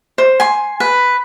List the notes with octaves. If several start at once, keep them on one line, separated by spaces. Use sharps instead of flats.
C5
G#5 C6
B4